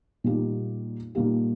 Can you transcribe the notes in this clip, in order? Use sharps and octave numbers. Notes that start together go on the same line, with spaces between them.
A#2 G3 A#3 D#4 G4
A#2 G3 A#3 D#4 G4